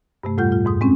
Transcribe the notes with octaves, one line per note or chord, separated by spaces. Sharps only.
G2 C3 A3
E2 A2 G3 F4 F#5 G6
F4
F2 G#2 D#6
G#3 C4 C#4